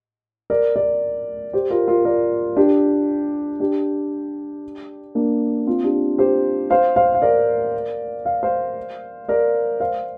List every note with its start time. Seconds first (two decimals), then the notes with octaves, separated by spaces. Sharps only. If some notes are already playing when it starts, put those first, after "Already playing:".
0.50 A#4 D5
0.76 A#4 D5
1.53 G4 C5
1.70 F4 A#4
1.88 F4 A#4
2.05 A#4 D5
2.57 D4 G4
3.60 D4 G4
5.15 A#3 D4
5.67 C4 F4
5.84 D4 G4
6.18 G4 C5
6.70 C5 F5
6.96 C5 F5
7.14 F5
7.22 A#4 D5
8.25 F5
8.43 C5 F5
9.29 A#4 D5
9.80 C5 F5